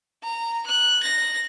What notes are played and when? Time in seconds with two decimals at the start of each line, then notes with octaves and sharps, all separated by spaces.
0.23 A#5
0.66 F#6
1.03 A#6